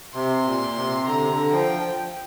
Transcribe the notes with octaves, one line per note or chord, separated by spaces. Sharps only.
C3 C6
A#2
C3
D3 A#5
C3
D3
F3 G5